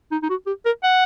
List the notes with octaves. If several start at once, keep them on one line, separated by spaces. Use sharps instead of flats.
D#4
D#4
F#4
G4
A#4
F#5